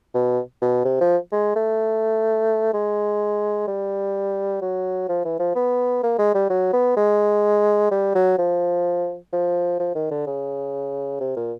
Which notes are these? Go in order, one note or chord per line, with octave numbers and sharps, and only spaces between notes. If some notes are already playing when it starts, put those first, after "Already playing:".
B2
B2
C3
F3
G#3
A3
G#3
G3
F#3
F3
E3
F3
B3
A#3
G#3
G3
F#3
B3
G#3
G3
F#3
F3
F3
F3
D#3
D3
C#3
C3
A#2